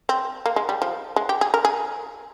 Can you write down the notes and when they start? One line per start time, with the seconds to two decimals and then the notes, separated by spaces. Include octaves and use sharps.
0.09 C4
0.46 A#3
0.56 G#3
0.69 G3
0.82 F3
1.16 G#3
1.29 G4
1.41 G#4
1.54 A#4
1.65 G#4